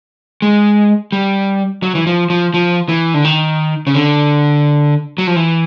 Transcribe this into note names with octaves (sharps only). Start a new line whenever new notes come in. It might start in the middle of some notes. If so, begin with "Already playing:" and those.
G#3
G3
F#3
E3
F3
F3
F3
E3
D3
D#3
C#3
D3
F#3
F3
E3